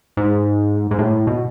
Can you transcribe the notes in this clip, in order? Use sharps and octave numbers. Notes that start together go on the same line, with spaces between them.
G#2
G#2
A2
B2